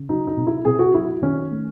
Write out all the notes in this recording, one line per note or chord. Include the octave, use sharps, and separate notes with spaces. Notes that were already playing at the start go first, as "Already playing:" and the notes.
Already playing: C#3
F#3 D#4
D#4
C3
E4
C3 G#4
F#4
F#3 E4
D#3 C#4
A3